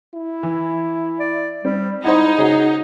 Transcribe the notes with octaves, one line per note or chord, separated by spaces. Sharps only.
E4
E3
D5
G3 C4
G#2 D#4 E4 C5 D#5 F#5
C#3 C#4 F#4 G#4